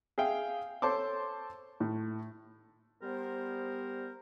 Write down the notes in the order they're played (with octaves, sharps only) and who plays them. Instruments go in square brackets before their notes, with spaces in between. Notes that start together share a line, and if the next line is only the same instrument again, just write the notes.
[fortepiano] G#4 E5 F5 G5
A4 C5 C#5 A5 C6 D6
A2
[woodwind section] G3 B3 A#4 C5